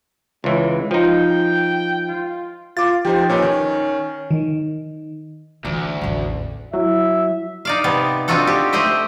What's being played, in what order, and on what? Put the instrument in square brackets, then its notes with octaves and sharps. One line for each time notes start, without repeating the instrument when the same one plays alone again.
[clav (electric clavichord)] C#2 E3 [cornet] G#3
[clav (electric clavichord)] F3 D#4 [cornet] G5
[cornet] F4
[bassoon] F4 [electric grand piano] D6 A6
[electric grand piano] F3 D#4 C5 [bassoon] G4
[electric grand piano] A#2 D#4 B4 [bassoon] C#4
[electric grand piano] D#3
[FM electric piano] D#3
[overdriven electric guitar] D2 [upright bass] E3 E4
[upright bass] A1 E2
[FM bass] F#3 [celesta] E4 [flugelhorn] E5
[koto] D#4 D5 F5
C3 B3 A5
C4 D4 D#4 F4 F#4 A4
G4
A3 G4 C5 D#5 E5